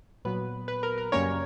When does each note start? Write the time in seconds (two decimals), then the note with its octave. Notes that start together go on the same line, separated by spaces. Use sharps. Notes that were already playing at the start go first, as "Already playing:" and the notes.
0.25 A#2 F#3 B3 B4
0.68 B4
0.83 A#4
0.98 A#4
1.12 F#2 C#3 G3 A#3 C#4 A#4 C#5